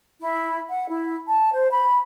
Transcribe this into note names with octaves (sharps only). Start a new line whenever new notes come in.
E4
F#5
E4
A5
C5
B5